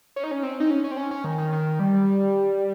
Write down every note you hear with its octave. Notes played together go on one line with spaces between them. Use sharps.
C#4
D#4
C#4
C4
D#4
C#4
C#4
C4
C#4
C#4
D#3
D#3
D#3
G3